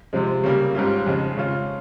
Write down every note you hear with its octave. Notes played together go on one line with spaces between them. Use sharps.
C3 F3 G#3
C#3 G3 A#3
G#2 G3 C#4 F4
F2 C#3 G#3
C#3 G#3 C#4 F4